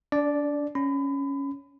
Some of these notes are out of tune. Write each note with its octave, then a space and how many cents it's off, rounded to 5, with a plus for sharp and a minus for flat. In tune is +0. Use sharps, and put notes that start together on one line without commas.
D4 -30 D5 +0
C#4 +0 B5 +30